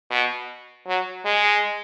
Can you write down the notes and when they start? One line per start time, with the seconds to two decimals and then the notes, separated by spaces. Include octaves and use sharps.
0.11 B2
0.87 F#3
1.25 G#3